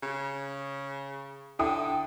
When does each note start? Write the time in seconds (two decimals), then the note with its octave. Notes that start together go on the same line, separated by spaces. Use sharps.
0.03 C#3
1.59 D3 E4 G5 D#6